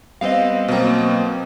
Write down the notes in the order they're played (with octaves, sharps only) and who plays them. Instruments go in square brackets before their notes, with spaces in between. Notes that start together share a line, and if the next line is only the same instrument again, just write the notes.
[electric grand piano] G3 B3 C4 [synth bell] D#5 F5
[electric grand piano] B2 F#3 A#3 [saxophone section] C4